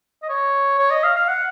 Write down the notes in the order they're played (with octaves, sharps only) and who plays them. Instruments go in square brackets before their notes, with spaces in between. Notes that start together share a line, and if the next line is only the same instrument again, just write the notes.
[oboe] D#5
C#5
C#5
D#5
F5
F5
F#5